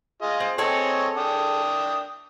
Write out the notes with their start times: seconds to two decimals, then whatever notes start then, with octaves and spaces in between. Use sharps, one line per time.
0.22 F4 G#4 D#5
0.40 C4
0.58 C4 G#4 A4 C#5 D#5 G#5
1.16 D4 G5 D#6